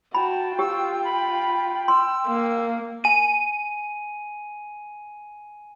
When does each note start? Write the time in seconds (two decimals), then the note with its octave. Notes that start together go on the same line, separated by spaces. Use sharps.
0.15 F#4 G5 A5 B5
0.59 F4 G4 E6
1.05 B5
1.88 C6 E6
2.27 A#3
3.04 G#5 D#7